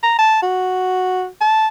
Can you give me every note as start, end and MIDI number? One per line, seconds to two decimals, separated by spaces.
0.03 0.19 82
0.19 0.40 81
0.42 1.26 66
1.41 1.67 81